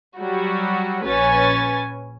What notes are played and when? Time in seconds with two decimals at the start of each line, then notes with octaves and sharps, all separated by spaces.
0.16 F#3 G3 F#4
1.03 A#1 C#4 B4 C#5 G#5 A6